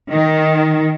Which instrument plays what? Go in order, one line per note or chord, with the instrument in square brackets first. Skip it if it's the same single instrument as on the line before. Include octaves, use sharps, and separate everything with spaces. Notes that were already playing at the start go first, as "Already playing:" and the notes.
[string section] D#3